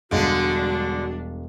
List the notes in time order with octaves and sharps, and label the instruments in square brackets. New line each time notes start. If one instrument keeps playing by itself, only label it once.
[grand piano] E1 F5 [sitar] D3 G#3 [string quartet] G3 D4 [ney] F#4